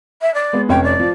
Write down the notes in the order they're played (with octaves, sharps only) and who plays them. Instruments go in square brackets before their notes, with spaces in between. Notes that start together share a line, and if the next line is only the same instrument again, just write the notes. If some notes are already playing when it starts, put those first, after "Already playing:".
[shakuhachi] E5
D5
[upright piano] G#3 B3
[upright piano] F1 C#4 C#5 [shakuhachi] G5
[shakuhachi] D5
[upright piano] F3